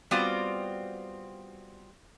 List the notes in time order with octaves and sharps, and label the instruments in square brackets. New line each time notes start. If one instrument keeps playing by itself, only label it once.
[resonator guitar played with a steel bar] G3 B3 C4 F4 F#4 D5